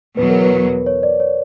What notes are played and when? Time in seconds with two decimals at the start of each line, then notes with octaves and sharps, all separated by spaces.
0.17 E2 B2 F#3 B4
0.29 A#4
0.43 B4
0.86 C#5
1.03 D5
1.20 C#5